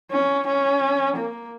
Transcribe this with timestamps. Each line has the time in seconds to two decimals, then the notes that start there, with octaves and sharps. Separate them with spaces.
0.11 C#4
0.47 C#4
1.16 A#3